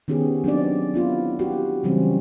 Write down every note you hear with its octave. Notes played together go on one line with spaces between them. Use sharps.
D#3 B3 C#4 G4 G#4
F#3 C4 D4 D#4 D5
B3 E4 F4
F#4 G4
C#3 E3 F#3 G3 C4 C#4